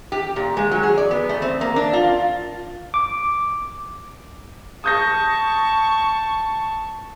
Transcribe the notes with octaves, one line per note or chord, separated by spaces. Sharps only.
G4
A#2
G#3
F#3
G#4
D5
B3
A3
C4
A#3
D4
F4
D6
A5 C#6 D#6 G6 A#6